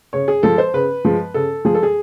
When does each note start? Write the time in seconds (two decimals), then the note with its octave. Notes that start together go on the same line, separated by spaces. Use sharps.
0.13 C#3 C#5
0.28 G#4
0.43 F3 G#3 A4
0.58 C5
0.74 C#3 B4
1.05 F3 G#3
1.34 C#3 A4
1.65 F3 G#3 G#4
1.74 A4
1.83 G#4